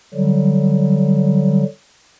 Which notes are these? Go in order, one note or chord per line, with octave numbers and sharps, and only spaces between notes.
D3 F#3 G3